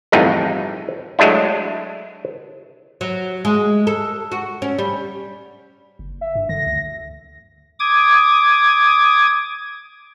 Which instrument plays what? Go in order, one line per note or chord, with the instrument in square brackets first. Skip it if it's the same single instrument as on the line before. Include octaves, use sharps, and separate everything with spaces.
[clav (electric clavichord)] G1 F2 A2 E3 D#4 G#4
F#3 G#3 A3 D4 E4
[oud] F#3
G#3
A4
F#4
C#4
G3
[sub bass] F#1
[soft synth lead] E5
[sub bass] G2
[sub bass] D3 [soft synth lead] A#6
[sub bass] D2
[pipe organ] D6 D#6 G#6